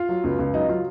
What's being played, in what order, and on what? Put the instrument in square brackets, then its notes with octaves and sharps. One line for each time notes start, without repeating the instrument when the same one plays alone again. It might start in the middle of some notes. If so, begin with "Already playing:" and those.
Already playing: [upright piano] F4
F#3
C#2
C#2
F#3 D#4
F#3 F4